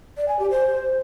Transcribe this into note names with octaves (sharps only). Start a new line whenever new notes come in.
D5
G#5
G4
C5